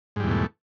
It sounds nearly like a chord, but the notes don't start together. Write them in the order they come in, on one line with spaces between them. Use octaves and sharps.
G#2 G3 E2 B2 A3